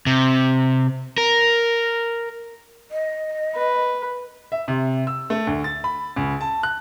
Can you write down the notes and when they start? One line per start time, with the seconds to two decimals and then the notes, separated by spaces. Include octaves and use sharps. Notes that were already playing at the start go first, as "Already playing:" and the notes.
0.07 C3
1.18 A#4
2.91 D#5
3.55 B4
4.52 E5
4.68 C3
5.07 E6
5.30 A3
5.47 D2
5.64 A6
5.84 B5
6.16 C#2
6.41 A5
6.63 F#6